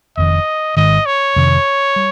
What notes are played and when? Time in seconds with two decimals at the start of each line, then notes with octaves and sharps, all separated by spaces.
0.17 F1 F2 D#3 D#5
0.76 G#1 G#2 D#3 D#5
1.06 C#5
1.36 F2 C3 D#3
1.96 G3